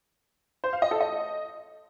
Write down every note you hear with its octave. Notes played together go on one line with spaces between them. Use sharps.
C5
F5
D#5
A4
D#5